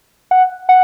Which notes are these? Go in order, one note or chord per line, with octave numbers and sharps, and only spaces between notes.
F#5
F#5